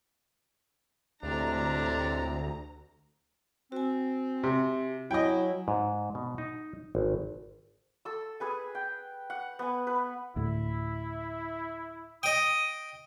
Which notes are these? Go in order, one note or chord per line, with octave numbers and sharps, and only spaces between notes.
D2 A2 C3 G#3 D4 A#5
C4 F#4 G#5
C3
F#3 E4 D#5 G5 G#5
G#2
B2
D#4
G#1
A4 E6
G#4 B4 G#5
G5
F#5
B3 G#5
B4
D2 A2 E4
D#5 G5 D#6